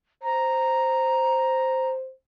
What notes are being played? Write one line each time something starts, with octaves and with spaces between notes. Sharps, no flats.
C5 A#5